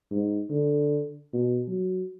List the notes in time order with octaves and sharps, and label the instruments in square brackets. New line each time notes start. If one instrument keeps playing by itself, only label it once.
[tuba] G#2
D3
B2
F#3